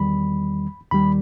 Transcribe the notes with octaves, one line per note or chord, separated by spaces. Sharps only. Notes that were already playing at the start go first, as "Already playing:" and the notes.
Already playing: E2 D#3 G3 B5
D#2 D#3 G3 B5